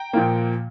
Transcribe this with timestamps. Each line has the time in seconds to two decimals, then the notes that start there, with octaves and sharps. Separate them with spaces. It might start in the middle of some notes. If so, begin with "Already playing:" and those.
Already playing: G5 A#5
0.13 A#2 F3 A#3